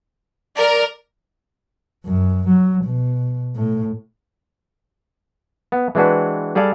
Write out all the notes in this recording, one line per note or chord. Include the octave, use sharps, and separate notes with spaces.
A#4 D5
F#2
F#3
B2
A2
B3
E3 G#3 C4 D4 F#4 B4
G3 G#4 A4 D5 F5